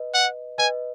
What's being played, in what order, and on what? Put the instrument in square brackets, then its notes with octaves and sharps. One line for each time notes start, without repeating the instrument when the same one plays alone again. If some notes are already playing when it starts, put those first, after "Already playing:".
Already playing: [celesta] B4 D#5
[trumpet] F#5
[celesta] B4 D#5 [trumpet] G#5